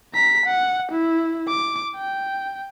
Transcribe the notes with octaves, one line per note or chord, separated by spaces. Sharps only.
A#5 B6
F#5
E4
D6
G5